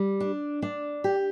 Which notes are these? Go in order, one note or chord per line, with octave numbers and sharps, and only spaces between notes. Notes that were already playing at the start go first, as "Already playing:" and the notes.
Already playing: G3
D4
D4
G4